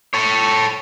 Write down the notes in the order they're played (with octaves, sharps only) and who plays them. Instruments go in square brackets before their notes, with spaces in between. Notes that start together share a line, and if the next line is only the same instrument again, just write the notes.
[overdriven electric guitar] A4 C#5